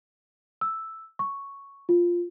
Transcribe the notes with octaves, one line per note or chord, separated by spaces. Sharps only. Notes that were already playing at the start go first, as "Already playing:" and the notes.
E6
C#6
F4